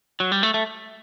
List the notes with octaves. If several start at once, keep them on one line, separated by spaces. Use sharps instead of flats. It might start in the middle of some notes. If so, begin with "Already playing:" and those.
F#3
G3
A3
A3